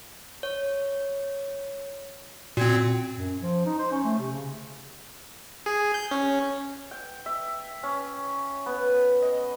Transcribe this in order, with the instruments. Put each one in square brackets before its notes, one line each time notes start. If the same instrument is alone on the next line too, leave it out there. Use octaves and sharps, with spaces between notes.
[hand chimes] C#5
[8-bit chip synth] A#2 C4 [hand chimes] F#4 G#6
[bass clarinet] F#2
F3
D#4
C5
C#4
A3
C3
C#3
[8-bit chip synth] G#4
G6
C#4
[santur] G5
E5
C#4
B3
D#5